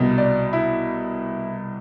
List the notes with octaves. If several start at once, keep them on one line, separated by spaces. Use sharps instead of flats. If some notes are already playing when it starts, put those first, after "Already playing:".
Already playing: C2 B2
D5
E4